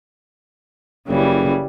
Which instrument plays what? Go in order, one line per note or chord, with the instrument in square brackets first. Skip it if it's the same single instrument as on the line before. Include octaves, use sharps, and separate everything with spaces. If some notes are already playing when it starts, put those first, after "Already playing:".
[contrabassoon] F#1 [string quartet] C#3 E3 G3